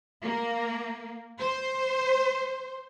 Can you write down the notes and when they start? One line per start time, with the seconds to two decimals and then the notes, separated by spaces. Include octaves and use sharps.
0.23 A#3
1.39 C5